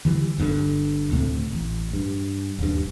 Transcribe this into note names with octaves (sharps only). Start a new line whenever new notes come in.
D3 E3 G3
G1 G2 B2 D3
D2 A2 C3 A3
A1
G2
D#1 G2